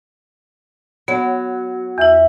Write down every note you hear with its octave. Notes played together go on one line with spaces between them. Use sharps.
F#3 B3
E2 E4 E5